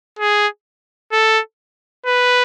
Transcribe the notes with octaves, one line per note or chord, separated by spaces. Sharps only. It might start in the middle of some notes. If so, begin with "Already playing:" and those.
G#4
A4
B4